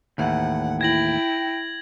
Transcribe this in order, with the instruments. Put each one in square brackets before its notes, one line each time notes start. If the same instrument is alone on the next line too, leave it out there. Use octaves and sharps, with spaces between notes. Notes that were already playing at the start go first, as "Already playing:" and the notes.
[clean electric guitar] D#2 A2 E3 [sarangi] F#5
[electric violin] E4 [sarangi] G5 [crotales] G#6 A#6 F#7